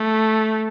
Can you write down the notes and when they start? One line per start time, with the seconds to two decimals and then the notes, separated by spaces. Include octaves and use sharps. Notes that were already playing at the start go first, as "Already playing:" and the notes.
Already playing: A3